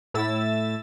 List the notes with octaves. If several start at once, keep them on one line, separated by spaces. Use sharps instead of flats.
A2 E4 E6 A6